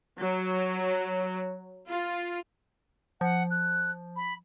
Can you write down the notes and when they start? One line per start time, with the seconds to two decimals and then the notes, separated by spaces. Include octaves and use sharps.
0.20 F#3
1.88 F4
3.21 F3 F#5
3.51 F#6
4.16 B5